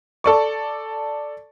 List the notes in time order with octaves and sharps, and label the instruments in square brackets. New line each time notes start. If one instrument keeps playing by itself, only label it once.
[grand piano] A4 D5 C#6